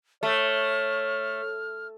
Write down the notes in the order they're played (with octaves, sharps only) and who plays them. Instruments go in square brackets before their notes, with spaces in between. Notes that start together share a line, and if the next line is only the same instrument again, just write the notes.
[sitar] A3 [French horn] C#5 [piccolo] F6